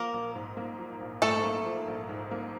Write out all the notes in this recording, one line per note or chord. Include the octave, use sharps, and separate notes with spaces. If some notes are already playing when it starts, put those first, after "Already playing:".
Already playing: F3 A#3 A#4
A#1
G#2
A#3
F3
A#1
G#2 A3 A4
A#3
F3
A#1
G#2
A#3